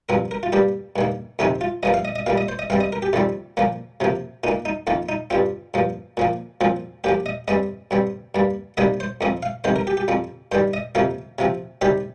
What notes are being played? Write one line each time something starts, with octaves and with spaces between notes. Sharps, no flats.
G2 F3 C4 A#4
A#4
F4
G2 G3 A#3 G4
G2 D#3 A#3
F2 C3 D#3 C4 D#4
F4
G2 F3 A#3 D#5
F5
D#5
D#5
A#2 G3 A#3 F5
D#5
C5
D#5
G2 G3 C4 F5
D#5
A#4
G4
F2 D#3 G3 C4 F4
A#2 F3 A#3
C3 F3 A#3
A#2 A#3 D#4
D#4
F2 D#3 A#3 F4
D#4
G2 G3 C4 F4
G2 F3 A#3
A#2 F3 A#3
A#2 F3 C4
A#2 F3 A#3 G4
D#5
G2 G3 C4 D#5
G2 G3 C4
G2 G3 A#3
C3 D#3 G3 A#3 D#5
C5
F2 F3 C4 D#5
F5
F2 C3 D#3 C5
A#4
G4
G4
F2 F3 C4
G2 D#3 G3 C5
D#5
F2 C3 F3 A#3 F5
C3 F3 C4
C3 D#3 G3 C4 G4